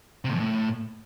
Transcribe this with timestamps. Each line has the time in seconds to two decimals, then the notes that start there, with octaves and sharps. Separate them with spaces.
0.25 C3
0.30 A2
0.35 F2
0.40 A2